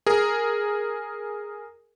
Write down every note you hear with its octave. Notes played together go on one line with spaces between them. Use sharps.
G#4 A#4